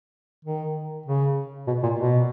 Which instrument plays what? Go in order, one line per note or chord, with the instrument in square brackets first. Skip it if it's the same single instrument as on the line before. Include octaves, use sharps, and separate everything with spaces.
[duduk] D#3
C#3
B2
A#2
B2